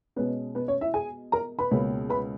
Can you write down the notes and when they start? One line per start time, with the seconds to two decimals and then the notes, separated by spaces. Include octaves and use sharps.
0.16 B2 G#3 B3 C#4 B4
0.55 B3 B4
0.68 C#4 C#5
0.81 E4 E5
0.94 G#4 G#5
1.32 A#4 A#5
1.59 B4 B5
1.71 C#2 B2 A#3 C#4
2.10 B4 B5